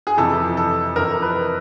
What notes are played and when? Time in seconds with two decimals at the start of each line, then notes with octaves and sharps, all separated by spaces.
0.07 G#4
0.17 F2 C3 E3 A4
0.57 A4
0.96 F2 C3 E3 A#4
1.22 B4